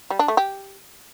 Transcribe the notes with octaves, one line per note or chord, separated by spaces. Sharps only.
G3
D4
A3
G4